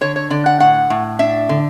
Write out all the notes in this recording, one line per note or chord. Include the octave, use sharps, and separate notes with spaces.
D3 C#5
C#5
D3 D5
F#5
A2 F#5
A2
D4 E5
D3